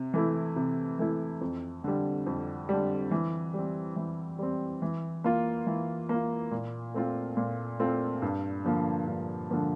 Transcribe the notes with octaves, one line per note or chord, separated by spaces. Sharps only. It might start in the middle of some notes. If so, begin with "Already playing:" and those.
Already playing: C3
E3 A3 E4
C3
E3 A3 E4
F2
D3 G3
F2
D3 G3
E3
G3 C4
E3
G3 C4
E3
A#3 F4
E3
A#3 F4
A#2
A3 C4 F4
A#2
A3 C4 F4
G2
D3 F3 A#3
G2
D3 F3 A#3